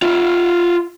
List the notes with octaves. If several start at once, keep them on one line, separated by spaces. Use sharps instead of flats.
F4 E5